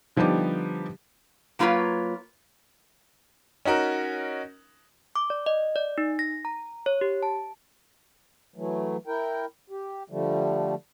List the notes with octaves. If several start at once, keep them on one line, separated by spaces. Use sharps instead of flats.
D3 F3 G3 B3 D#4 G4
F#3 A#3 F4 G4 B4 C#5
C#4 D#4 F#4 A#4
D6
D5
D#5
D5
D#4
A#6
A#5
C#5
G4
A5
E3 F#3 A3
E4 A#4 G5
G4
D3 F3 G3 A3